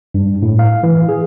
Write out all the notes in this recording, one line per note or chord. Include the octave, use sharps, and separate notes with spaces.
G2
A2
F5
E3
G#4